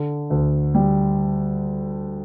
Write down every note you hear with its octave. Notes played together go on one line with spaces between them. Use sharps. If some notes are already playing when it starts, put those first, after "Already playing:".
Already playing: D3
D2
G3